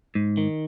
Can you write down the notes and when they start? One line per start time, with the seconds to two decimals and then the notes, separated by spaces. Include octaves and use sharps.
0.15 G#2
0.37 D#3